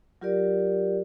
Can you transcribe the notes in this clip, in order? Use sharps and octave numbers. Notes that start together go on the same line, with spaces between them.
F#3 F4 G4 A#4 D5